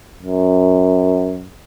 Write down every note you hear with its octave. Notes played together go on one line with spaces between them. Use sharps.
F#2